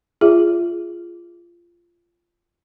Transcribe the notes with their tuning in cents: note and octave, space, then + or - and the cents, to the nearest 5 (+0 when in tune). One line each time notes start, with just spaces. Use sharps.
F4 -15 G#4 -5 E5 +10